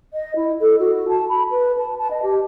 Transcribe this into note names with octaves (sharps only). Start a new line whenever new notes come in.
D#5
E4
A4
F#4
A5
B5
B4
A5
A5
D#5
G4